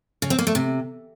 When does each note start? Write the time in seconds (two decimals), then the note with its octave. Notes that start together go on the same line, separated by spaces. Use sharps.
0.22 C#3
0.30 C4
0.39 A#3
0.47 A3
0.55 C3